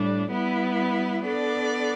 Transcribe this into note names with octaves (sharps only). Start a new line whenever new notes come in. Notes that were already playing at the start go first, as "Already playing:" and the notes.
Already playing: A2 G3 D4
G3 B3 E4
B3 D4 A4 D5